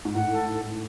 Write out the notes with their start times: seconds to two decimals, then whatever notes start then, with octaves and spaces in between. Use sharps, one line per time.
0.05 G#2
0.15 A2 F#5
0.31 A4